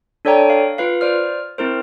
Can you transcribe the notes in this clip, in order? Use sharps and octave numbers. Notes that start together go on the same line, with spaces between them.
D4 A4 C#5 D5 G5 A#5
F5
F4 B4 F5
C5 D5 F6
C4 E4 A#4 C5